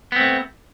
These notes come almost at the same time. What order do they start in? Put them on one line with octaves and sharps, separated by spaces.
B3 C4 A3